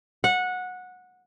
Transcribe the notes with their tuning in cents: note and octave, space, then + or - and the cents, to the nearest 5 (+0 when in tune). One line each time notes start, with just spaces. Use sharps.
F#5 -15